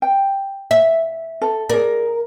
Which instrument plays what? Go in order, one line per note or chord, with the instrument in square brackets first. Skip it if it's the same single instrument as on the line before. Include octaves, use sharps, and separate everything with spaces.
[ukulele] G5
[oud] E5
[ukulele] A4
[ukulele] G#4 D5 [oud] A#4